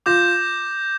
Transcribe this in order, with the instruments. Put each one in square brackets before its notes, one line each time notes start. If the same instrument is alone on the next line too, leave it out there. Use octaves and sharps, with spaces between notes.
[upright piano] F4 [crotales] D6 G6 A#6 E7